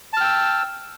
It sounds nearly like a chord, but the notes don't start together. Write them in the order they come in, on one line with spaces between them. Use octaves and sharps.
A5 F6 G5 E6